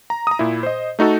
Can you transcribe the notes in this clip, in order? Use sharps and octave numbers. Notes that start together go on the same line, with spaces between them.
A#5
A#5 D#6
A#2 E4
C5 D#5
A3 D#4 F#4 A4